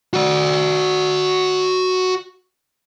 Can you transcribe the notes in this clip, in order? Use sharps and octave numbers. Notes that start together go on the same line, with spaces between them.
F#4 D5